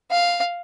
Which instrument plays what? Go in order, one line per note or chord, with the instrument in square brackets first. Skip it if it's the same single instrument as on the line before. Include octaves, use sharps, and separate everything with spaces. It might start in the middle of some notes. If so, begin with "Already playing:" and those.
[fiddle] F5